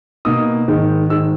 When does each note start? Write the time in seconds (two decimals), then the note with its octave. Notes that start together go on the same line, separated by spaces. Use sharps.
0.25 B2 A#3 D#4 D#6
0.68 G#2 D#3 G#3
1.10 G#2 D#3 G#3 E6